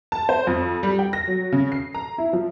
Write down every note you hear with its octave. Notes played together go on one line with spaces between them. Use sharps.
A5
C5
F2
G3
G5
A#6
F#3
C#3
C7
A#5
E4
F3